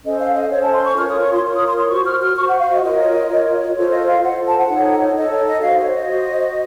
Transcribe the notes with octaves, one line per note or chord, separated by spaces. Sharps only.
C#4 A4 C5 D#5
F5
D#5
C#4 A4 C5 C#5
A5
C6
C#6
F4 A#4 C#5 F6
D#6
C#6
C6
F4 A#4 C#5
D#6
C6
C6
F#4 C5 C#6
F6
F6
F#4 C5 C#6
F#5
F5
D#5
F4 A#4 C#5 D#5
F4 A#4 C#5
F4 A4 C5 C#5
D#5
F5
F4 A4 C5 F#5
A5
F#5
D#4 A4 C#5
D#4 A4 C#5 D#5
C#5
D#5
F#4 C5 F5
C#5
D#5
F#4 C5